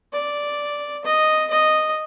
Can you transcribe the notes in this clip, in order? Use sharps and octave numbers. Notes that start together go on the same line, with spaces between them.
D5
D#5
D#5